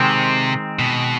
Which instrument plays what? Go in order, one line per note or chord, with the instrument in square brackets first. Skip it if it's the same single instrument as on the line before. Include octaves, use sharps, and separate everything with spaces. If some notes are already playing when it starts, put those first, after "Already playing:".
Already playing: [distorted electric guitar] C3 [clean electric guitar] D#3 G#3 C4
[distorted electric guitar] B2